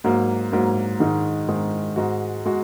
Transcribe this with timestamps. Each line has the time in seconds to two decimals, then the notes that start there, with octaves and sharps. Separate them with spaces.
0.04 G#2 F#3 A#3
0.52 G#2 F#3 A#3
1.00 G#2 D#3 G#3 D#4
1.48 G#2 D#3 G#3 D#4
1.96 G#2 G#3 F#4
2.46 G#3 F#4